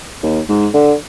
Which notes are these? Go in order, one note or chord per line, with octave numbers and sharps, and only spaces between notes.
D#2
G#2
D3